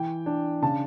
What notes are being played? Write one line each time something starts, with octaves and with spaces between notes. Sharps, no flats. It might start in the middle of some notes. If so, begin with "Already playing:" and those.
Already playing: E3 G5
D4
C#3 A5